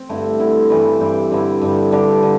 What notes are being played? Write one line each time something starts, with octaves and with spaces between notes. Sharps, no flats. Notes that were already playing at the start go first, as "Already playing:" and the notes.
Already playing: C4
G2 D3 A3 E4
D3 C4 E4
G2 E3 G3
G2 G3 C4 G4
G2 D3 C4 E4
G2 D3 G3
D3 G3 D4 G4
D3